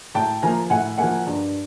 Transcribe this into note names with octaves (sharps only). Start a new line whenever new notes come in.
A2 G5 A5
F3 A#3 G#5 A#5
A2 F#5 G#5
F3 A#3 F#5 G#5
G2